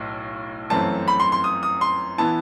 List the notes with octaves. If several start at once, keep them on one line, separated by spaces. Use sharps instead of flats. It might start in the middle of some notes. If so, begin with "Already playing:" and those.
Already playing: B1 A2
G1 F#2 E3 A3 C4 A5
B5
C6
C6
D#6
D#6
C6
E3 B3 E4 A5